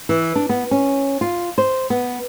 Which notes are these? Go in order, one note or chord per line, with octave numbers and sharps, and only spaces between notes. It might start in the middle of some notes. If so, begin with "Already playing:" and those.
E3
D4
B3
C#4
F4
C5
B3